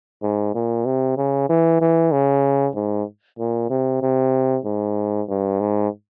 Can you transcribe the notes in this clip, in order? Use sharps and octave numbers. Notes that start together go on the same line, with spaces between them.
G#2
A#2
C3
C#3
E3
E3
C#3
G#2
A#2
C3
C3
G#2
G2
G#2